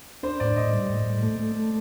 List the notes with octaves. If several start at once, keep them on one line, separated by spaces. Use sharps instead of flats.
D4 C5
A2 D5
A2 D#5
G3
A2
A2
A3
A3
A3